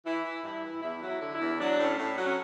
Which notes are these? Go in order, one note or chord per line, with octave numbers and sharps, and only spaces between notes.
E3 E4
E3
G2 E4
E3
E2 E4
F#3
E4
D3
E4
E2
F#3 D4
A2
C#4
A2
F#3
C#4